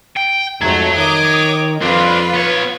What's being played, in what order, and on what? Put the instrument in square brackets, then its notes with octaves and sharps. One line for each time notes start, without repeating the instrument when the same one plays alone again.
[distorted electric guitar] G5
[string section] F2 F#3 A3 [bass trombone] G#2 [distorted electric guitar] C#5 A#5
[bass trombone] D#3 [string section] D6 D#6
[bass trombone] F2 [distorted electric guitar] C4 D4 [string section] F4 B4
[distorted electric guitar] B3 C#5